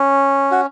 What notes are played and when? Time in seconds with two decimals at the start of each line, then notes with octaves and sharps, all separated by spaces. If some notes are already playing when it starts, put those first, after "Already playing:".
Already playing: C#4
0.51 F#4